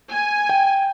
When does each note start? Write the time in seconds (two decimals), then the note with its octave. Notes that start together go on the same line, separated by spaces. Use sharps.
0.11 G#5
0.49 G5